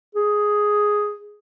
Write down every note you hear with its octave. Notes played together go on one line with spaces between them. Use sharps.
G#4